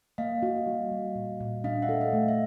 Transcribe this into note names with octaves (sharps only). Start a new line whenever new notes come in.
A#3 D#5 F5
F#4
G3
G3
A#2
A#2
D4 D#5 F5
E5 F#5
A4
D#5 F5
A3
E5